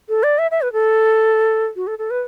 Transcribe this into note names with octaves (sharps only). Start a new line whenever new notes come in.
A4
D5
E5
E5
B4
A4
F#4
A4
A4
B4